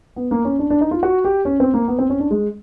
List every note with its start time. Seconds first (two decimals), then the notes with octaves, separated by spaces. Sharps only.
0.16 B3
0.31 A#3
0.45 C#4
0.59 D4
0.70 D4
0.81 D#4
0.91 F4
1.03 F#4
1.25 G4
1.45 C#4
1.60 C4
1.74 A#3
1.88 B3
1.99 C4
2.10 C#4
2.20 D4
2.31 G#3